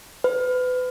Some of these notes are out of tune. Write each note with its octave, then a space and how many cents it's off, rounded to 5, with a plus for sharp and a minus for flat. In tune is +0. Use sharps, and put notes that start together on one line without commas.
B4 +30